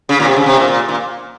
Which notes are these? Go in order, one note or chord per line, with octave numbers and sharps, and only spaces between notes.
C#3
A#2
C3
C#3
C3
A#2
A#2
A#2